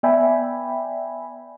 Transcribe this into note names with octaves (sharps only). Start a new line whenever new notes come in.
B3 D5 E5 G5 G#5 B5